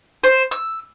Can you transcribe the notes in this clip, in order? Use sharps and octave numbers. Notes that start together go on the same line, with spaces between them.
C5
E6